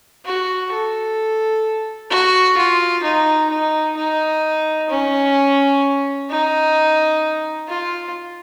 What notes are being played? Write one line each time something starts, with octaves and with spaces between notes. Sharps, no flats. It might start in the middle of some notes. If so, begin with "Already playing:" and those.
F#4
A4
F#4
F4
D#4
D#4
D#4
C#4
D#4
F4